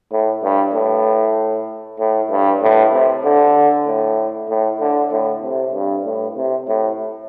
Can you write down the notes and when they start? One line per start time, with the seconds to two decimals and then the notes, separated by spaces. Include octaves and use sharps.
0.11 A2
0.42 G2
0.74 A2
1.99 A2
2.30 G2
2.62 A2
2.92 C3
3.24 D3
3.87 A2
4.49 A2
4.80 D3
5.12 A2
5.43 C3
5.74 G2
6.05 A2
6.36 C3
6.68 A2